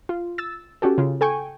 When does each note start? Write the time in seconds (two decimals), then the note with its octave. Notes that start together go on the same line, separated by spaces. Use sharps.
0.09 F4
0.38 E6 A6
0.82 C#4 F#4 G4 A4
0.98 C#3 F4
1.21 A4 G5 G#5 C#6